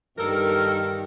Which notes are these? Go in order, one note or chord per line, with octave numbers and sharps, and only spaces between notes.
G2 D#3 A4 A#4